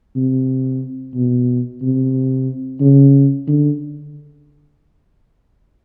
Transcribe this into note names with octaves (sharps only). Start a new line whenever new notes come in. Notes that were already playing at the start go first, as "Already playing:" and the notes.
C3
B2
C3
C#3
D3